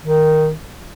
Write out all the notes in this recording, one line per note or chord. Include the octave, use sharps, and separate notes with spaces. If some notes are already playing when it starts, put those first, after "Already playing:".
D#3